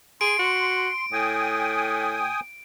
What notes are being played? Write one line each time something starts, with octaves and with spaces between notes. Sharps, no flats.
G#4 C6 D7
F#4
A2 G5 G#5 D#6